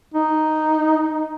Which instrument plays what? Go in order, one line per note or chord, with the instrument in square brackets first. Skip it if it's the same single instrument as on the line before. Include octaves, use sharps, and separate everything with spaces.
[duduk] D#4